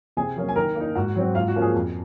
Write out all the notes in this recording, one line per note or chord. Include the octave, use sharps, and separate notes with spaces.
C3 G#4 G#5
F#3 A#3 C#4
G#5
D#3 A#4 A#5
A#3
D#4
G#2 F#4 F#5
F#3 C4
G#2 F4 F5
F#4
F3 A#3 C#4
G#4
F2